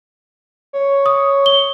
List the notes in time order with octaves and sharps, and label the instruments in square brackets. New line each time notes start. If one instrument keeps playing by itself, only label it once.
[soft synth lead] C#5
[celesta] D#6
G7